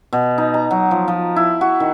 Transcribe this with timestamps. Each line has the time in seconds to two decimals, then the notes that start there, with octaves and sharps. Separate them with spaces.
0.13 B2
0.38 D#4
0.54 A#5
0.71 F#3
0.91 F3
1.08 F3
1.36 E4
1.61 F#4
1.80 D#3